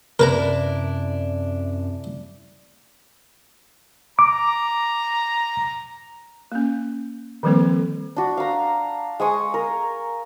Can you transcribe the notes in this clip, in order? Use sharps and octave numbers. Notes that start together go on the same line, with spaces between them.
F#2 C3 D4 E4 A#4 B4 A#5
A#5 D6
A#3 C#4
D#3 F3 G3 A#3 C4 A4
D4 F#4
F5 A#5
G#3 G#5 C#6 D#6
A#4